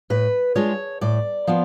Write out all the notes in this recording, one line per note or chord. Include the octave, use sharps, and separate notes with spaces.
A2 B4
G#3 D4 F4 C#5
A2 D5
F3 B3 F4